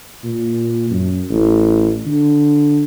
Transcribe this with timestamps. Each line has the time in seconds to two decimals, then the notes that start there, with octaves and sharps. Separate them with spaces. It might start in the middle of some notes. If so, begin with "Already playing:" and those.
0.24 A#2
0.90 F#2
1.30 A1
2.06 D3